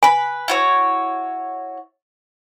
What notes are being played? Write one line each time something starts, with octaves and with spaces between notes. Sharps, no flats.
B4 G#5 B5
E4 F#4 C#5